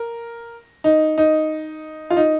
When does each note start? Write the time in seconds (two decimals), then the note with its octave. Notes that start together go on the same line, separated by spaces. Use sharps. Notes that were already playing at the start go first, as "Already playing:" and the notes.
Already playing: A#4
0.84 D#4
1.18 D#4
2.10 F4
2.17 D#4